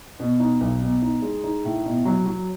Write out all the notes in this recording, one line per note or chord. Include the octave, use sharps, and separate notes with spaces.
B2
D#4
B1
B2
D#4
G#3
D#4
A2
B2
F#3
F#3